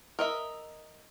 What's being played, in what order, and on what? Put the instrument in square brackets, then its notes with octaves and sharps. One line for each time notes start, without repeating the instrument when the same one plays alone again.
[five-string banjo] A#4 D#5 E5